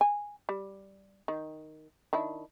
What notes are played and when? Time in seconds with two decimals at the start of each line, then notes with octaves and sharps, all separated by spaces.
0.01 G#5
0.49 G3
1.28 D#3
2.13 D#3 D4 E4